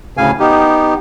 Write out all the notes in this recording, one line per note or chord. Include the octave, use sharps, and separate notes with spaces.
D2 A2 C#3 F5 G#5
B3 D#4 G4